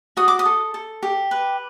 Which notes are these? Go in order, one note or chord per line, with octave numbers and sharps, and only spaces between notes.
F#4 D#6
D6
D#6
A4
A4
G4
B4